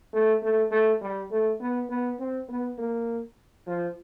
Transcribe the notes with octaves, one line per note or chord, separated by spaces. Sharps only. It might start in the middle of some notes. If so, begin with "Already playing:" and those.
A3
A3
A3
G3
A3
B3
B3
C4
B3
A#3
F3